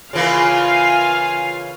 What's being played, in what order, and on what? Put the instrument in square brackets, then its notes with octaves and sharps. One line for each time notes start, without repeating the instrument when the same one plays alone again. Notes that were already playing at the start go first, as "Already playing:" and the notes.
[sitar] C#3 E3 A#3 [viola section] F4 F5 [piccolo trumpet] G#5